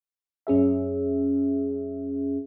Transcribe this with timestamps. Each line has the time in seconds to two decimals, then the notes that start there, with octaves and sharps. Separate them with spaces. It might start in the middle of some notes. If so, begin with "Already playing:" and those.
0.47 F#2 C#4 G#4 E5